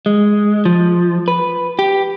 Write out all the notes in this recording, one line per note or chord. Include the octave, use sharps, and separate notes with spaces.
G#3
F3
B4
G4